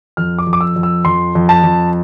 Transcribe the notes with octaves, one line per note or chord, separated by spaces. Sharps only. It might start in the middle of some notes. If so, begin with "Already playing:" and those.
F2 F6
D6
F2
D6
E6
F2
E6
F2 C6
F2
A5
F2